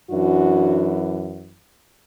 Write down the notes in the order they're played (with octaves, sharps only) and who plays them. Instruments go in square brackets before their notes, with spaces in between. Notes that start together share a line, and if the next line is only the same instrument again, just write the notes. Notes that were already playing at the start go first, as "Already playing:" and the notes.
[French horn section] F#2 E3 D4 F#4